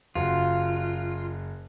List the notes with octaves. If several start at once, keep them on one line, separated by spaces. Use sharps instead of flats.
F#1 F4 F#4